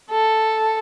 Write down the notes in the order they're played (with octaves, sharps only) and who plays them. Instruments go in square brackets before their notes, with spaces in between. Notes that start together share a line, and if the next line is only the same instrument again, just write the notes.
[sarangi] A4